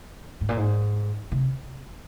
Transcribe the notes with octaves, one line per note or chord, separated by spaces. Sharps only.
G#2
A#2
G#2
C3